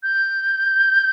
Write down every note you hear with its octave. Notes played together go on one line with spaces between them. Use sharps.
G6